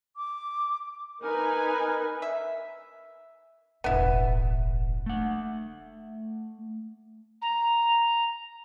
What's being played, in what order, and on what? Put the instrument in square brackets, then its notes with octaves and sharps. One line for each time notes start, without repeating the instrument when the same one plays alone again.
[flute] D6
[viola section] D#4 B4 G#5 [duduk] A#4
[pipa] E5
[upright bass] E1 A1 [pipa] B3 E4
[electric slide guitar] A3 F#5
[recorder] A#5